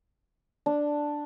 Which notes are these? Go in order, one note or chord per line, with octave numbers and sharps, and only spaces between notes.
D4